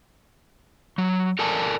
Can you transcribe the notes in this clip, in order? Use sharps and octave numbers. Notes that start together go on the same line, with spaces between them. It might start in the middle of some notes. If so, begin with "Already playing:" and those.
F#3
A4 A#4 D5 G#5 A5